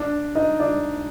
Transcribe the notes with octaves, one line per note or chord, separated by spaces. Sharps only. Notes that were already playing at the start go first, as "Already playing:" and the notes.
Already playing: D4 D5
D#4 D#5
D4 D5